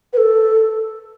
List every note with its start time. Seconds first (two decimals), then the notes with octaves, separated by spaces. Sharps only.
0.13 B4
0.17 A4